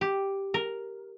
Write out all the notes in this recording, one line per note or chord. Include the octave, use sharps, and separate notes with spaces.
G4
A#4